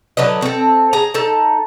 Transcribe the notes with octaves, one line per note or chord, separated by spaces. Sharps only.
D3 F#3 B4 D#5
C4 A4
G#4 A#5
D#4 A4